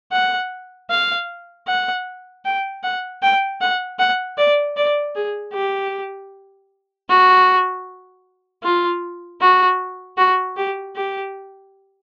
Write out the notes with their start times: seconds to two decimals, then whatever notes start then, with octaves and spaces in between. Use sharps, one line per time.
0.12 F#5
0.90 F5
1.67 F#5
2.45 G5
2.83 F#5
3.22 G5
3.61 F#5
3.99 F#5
4.38 D5
4.77 D5
5.15 G#4
5.54 G4
7.09 F#4
8.63 F4
9.41 F#4
10.18 F#4
10.57 G4
10.96 G4